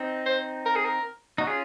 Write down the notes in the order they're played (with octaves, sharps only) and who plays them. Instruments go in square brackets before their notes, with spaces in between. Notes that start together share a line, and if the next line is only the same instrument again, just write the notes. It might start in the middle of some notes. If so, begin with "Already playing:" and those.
Already playing: [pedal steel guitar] C4 D#4
[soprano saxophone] C5
A#4
G#4
A#4
[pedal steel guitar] D#4 [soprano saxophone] F#4
[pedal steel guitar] C#4 F4 [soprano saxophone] G#4